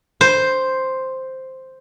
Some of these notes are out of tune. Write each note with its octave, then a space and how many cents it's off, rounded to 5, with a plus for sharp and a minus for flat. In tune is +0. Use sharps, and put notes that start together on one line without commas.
C5 +0